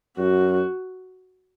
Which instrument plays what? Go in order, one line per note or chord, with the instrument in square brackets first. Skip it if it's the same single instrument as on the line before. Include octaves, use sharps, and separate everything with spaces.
[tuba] F#2 [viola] F#4